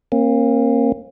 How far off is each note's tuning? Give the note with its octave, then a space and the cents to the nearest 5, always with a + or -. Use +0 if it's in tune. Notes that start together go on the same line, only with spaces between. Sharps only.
A#3 +0 C#4 -45